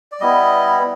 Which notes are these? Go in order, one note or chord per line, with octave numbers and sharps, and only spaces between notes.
D5
G3 B3 E4 D#5